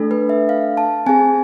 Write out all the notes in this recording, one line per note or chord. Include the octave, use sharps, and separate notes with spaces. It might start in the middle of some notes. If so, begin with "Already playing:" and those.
Already playing: A3 D4 A4
B4
E5
F5
A5
C4 G#4 G#5